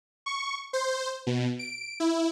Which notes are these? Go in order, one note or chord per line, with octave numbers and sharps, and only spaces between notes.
C#6
C5
B2
D7
E4